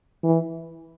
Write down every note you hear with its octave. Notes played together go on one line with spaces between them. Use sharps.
E3